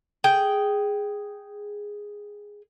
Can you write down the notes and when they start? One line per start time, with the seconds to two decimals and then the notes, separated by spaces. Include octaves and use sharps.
0.24 G#4 G5